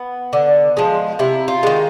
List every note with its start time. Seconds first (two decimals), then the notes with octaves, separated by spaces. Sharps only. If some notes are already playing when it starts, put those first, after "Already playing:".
Already playing: B3
0.33 D3
0.77 F3 G#3
1.19 C3 E4
1.48 F4
1.63 D#3 G#3